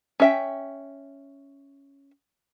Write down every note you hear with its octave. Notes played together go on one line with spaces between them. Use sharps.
C#4 E5 G5